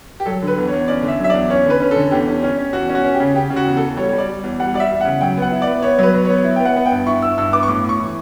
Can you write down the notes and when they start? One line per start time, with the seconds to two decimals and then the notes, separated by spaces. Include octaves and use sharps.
0.20 G4
0.26 F#3 A4
0.42 D3
0.47 B4
0.57 E2
0.67 C#5
0.72 E2
0.88 C#4 D5
1.03 D3
1.08 E5
1.20 F#3 E5
1.30 E2 D5
1.50 C#4 C#5
1.66 D3 B4
1.80 C#4
1.91 A4
1.96 D3
2.11 E2 G4
2.28 C#4
2.43 C#4
2.58 C#4
2.73 E2 F#4
2.89 C#4
2.95 F#4
3.04 C#4
3.14 G4
3.20 C#3
3.35 C#3 G4
3.50 C#3
3.56 F#4
3.67 E2
3.77 A4
3.82 E2
3.97 G3 C#5
4.09 G3 C#5
4.18 D5
4.28 G3
4.43 E2
4.60 G3 F#5
4.74 G3 D5
4.80 E5
4.91 E2
5.01 C#3 F#5
5.21 F#3 G5
5.37 B3 F#5
5.51 E4
5.62 D5
5.67 B3
5.82 B3 C#5
5.99 F#3 B4
6.14 F#3
6.25 B3 C#5
6.44 E4
6.56 B3 G5
6.65 F#5
6.76 B3
6.86 G5
6.92 G2
7.07 E4 C#6
7.22 E4 E6
7.38 G2 E6
7.53 B3 D6
7.63 C#6
7.68 A2 D6
7.84 A2
7.89 C#6
8.00 E3